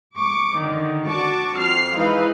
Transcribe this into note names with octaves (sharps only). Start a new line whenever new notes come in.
C#6 D6
D3 D#3
D4 F#4 A5 C#6 D6
F2 F6 C7
G#2 E3 D#4 B4 F5